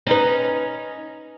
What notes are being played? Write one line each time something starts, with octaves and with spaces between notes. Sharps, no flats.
C#4 D#4 B4